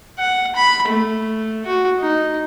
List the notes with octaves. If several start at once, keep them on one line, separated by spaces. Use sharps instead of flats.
F#5
B5
A3
F#4
D#4